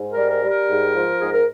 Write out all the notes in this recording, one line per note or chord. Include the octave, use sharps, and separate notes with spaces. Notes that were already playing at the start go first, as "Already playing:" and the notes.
Already playing: G#2
A#4
G3
A#4
G3
A#4
G#2
F3
G#2 G#4
A#4